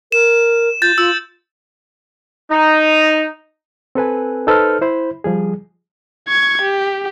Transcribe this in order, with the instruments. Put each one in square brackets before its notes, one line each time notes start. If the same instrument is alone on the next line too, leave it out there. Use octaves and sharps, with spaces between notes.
[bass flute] A#4 [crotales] E7
[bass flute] F4 [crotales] G6 A6
[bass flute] F4 [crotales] E6
[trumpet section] D#4
[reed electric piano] C4 A4 B4 G#5
D#4 A4 B4 C5 F6
E4 C5 B5
F3 G3 G#4
[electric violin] C#6 G#6
G4